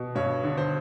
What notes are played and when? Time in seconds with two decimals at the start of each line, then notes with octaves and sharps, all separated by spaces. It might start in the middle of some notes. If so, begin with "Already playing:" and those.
Already playing: B2
0.15 G2 C#5
0.43 D3
0.57 C5